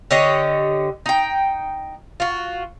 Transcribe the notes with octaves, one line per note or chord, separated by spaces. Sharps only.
D3 G4 C#5 D#5
D#4 G5
F4 F#4